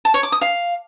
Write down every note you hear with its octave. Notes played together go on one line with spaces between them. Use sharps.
A5
C#5
D6
D#6
F5